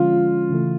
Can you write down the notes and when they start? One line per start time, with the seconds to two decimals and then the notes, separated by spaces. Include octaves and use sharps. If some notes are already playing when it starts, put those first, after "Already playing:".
Already playing: D3 F3 G#3 C#4 F4
0.50 C#3 E3 A3